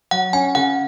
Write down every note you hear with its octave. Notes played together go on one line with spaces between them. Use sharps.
F#3 F#5
C#4 G#5
C#3 F#5